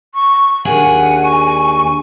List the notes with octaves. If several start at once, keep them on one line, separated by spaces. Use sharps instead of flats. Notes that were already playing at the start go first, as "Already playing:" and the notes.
C#6
D#2 D4 G#4 F#5 G#5
C#6